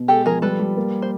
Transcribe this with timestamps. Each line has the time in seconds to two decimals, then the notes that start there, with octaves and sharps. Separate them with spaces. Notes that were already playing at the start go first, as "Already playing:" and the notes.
Already playing: B2
0.08 G#3 G4 A4
0.26 F3 G#4 A#4
0.42 G3 A4 B4
0.59 G3
0.77 A#3
1.02 C5